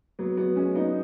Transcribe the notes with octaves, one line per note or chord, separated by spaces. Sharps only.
F#3 B3
F#3 B3
G#3 C#4
B3 D#4